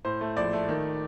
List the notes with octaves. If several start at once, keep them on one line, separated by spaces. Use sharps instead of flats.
A2 C5
A3
A#1 D5
A3
D#3